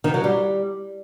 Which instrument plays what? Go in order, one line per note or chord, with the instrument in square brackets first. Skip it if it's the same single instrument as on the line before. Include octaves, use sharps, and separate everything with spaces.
[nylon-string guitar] D#3
F#3
G3